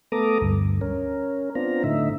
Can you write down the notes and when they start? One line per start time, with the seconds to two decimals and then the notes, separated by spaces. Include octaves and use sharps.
0.12 A3 B3 A4 A#5 D6 D#6
0.41 D2 G2
0.81 C#4 A#4
1.55 B3 C4 D4 F4 A#5
1.84 A2 D3 D#4 E5